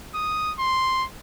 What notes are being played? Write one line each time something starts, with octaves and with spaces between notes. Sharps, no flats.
D#6
C6